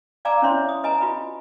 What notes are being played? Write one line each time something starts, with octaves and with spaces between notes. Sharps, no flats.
D5 F5 G#5 A#5 D6 E6
C#4 E4 C5 C#5 E5 C6
D#6
B4 D#5 G#5 A#5
F4 F#4 B4 B5